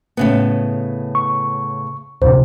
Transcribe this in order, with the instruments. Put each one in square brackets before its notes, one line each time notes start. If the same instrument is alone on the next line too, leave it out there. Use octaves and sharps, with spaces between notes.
[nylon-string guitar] A2 C#3 B3
[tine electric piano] C#6
[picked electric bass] D1 A#1 C3 [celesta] C5